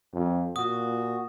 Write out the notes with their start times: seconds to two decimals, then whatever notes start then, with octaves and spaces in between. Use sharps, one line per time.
0.13 F2
0.56 A#2 F#4 D#6